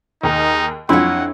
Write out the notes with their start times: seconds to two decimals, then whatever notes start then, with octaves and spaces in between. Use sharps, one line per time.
0.23 D#2 D#4 G#4 A#5
0.89 F2 F#3 D4 E4 F4 C#5 F#5 C6